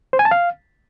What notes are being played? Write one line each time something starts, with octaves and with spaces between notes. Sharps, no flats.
C5
G#5
A5
F5